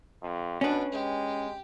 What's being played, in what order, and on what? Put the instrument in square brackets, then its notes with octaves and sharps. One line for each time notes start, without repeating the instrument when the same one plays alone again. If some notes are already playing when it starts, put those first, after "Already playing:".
[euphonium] F2
[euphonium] B2 [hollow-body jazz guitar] C#4 B4 [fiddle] D4
[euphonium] G#3 [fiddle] G4